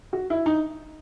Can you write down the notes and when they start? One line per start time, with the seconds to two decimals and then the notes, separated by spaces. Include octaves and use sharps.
0.13 F#4
0.30 E4
0.46 D#4